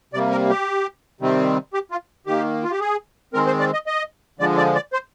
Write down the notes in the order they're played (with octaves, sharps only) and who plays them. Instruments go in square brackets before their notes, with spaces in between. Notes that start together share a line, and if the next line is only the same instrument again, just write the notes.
[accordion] C3 D5
G3 A#3
A#4
G4
C3 D#3 G3 C4
G4
F4
D#3 A#3 G4
F4
G4
G#4
D#3 G#3 C4 A#4
C5
D5
D#5
D#5
D3 F3 G#3 D5
D5
D5
C5